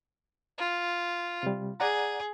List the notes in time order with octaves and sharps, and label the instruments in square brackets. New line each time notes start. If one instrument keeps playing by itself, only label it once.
[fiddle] F4
[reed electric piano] C3 G3
[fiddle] G#4 [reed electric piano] D5 F#5 A#5